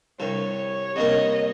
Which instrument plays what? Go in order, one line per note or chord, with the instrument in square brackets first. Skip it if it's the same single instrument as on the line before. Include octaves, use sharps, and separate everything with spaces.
[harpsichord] C2 G2 [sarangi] C#5
[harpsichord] C2 G2 A#3 [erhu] D#5